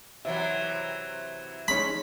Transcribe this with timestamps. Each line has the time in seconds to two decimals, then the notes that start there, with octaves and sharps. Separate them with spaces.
0.25 C3 E3 F#3 E5
1.68 G#3 C#4 D#4 B5